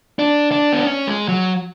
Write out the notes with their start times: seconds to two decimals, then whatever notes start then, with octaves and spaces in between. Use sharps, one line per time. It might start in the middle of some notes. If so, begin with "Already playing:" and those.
0.19 D4
0.52 D4
0.73 B3
0.85 C#4
1.07 G#3
1.28 F#3